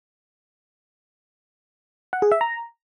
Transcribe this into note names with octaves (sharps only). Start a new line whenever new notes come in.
F#5
G#4
E5
A#5